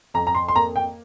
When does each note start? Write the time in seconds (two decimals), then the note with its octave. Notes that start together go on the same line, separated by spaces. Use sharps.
0.14 F2 A#5
0.27 A#5
0.35 C6
0.48 C6
0.55 A#3 A#5
0.76 G5